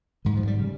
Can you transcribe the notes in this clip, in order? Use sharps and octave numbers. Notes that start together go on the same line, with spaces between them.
G#2 D#3
F3
G3
C#3 G3